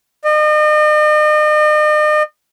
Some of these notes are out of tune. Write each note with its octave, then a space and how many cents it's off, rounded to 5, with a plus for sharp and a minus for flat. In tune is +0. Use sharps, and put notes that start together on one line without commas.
D#5 -40